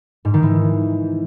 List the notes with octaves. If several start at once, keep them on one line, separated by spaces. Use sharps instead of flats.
G#2
D#3
E3